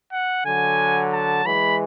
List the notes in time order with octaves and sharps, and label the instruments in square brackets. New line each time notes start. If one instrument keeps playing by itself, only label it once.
[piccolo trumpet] F#5
[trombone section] D3 F#3 [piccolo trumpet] G#5
[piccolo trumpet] A5
[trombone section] E3 G#3 [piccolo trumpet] B5